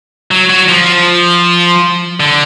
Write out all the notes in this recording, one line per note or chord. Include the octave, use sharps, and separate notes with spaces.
F#3
F#3
F3
D3